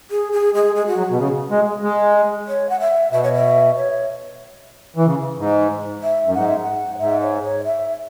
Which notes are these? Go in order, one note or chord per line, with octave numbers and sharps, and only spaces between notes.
G#4
G#4
G#3 G#4
G#3 G#4
F#4
F#3
B2
C#3 G#4
G#3
G#3
C#5
F#5
E5
B2 E5
C#5
E5
C#5
E3
C#3
G#2
E5
F#2
G#2 F#5
E5
F#5
C#5
G#2 E5
C#5
C#5
E5